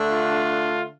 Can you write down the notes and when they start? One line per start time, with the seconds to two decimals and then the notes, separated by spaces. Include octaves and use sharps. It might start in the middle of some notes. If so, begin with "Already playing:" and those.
Already playing: D3 A3 D4
0.09 F4